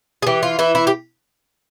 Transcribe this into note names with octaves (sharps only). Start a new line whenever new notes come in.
G#4
E3 G4
F4
E3 E4
E4
G4